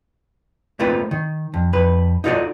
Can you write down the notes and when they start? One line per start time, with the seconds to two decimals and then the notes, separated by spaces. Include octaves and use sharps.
0.79 A3 A#3 C4 F4 B4
1.11 D#3
1.54 F2
1.73 F2 B4
2.24 D#4 F4 F#4 A4 D5 D#5